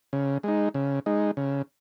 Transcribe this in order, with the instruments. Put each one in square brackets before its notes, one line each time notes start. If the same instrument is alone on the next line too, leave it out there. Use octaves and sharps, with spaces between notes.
[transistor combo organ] C#3
G#3 D#4
C#3
G#3 D#4
C#3